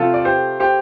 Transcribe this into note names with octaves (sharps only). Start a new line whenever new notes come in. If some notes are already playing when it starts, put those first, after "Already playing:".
Already playing: C3 F3 A3 F4 A4
D5
G4 C5
G4 C5